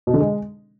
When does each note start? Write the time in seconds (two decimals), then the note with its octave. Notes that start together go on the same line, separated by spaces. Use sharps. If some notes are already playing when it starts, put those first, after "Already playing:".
0.07 B2
0.14 D3
0.20 G#3